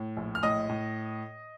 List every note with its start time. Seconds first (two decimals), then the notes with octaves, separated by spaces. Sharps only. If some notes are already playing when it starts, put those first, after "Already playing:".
Already playing: A2
0.17 A#1
0.35 F6
0.43 A2 D#5 D#6
0.69 A2